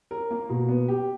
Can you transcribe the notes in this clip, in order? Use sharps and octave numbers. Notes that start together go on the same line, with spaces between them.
A#4
A#3
B2
B3
G4